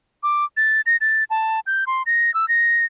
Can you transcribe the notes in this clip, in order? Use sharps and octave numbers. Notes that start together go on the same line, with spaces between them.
D6
A6
A#6
A6
A5
G6
C6
A#6
E6
A#6